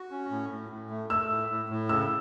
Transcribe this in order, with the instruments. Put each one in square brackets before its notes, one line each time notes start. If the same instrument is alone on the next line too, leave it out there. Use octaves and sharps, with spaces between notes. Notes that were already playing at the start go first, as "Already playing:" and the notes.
Already playing: [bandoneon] F#4
C#4
A2
A2
A2
A3
[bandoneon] A3 [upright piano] E6
[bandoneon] A2
A2
A2
[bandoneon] C#3 [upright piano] E6